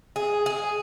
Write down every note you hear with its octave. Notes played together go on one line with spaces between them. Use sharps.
G#4
G#4